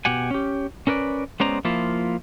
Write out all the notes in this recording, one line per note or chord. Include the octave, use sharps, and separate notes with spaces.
B2 G4 F#5 G#5
C#4 G4
C#4 A#4 B4 D5
G#3 B3 C#4 C5 D5 A#5
F3 A#3 E4 F4